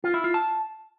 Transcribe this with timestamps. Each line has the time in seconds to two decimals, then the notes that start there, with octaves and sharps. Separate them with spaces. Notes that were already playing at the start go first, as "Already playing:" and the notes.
0.04 F4
0.14 E4
0.24 F4
0.34 A5